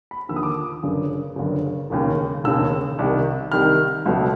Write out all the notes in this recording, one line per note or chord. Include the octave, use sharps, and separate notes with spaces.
B5
D#2 D3 F3 E6
D#6
D6
D#6
G1 F#2 C#3
G1 F#2 C#3
E1 D#2 C#3
E1 D#2 C#3 E6
C2 C3 D#3
C2 C3 D#3 F6
C#2 B2 F#3 A3